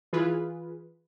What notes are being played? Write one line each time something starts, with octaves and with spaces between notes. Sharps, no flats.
E3 F4 G#4 B4